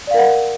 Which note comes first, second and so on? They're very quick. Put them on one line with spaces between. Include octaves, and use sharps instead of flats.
D5 F5 A#4 F#5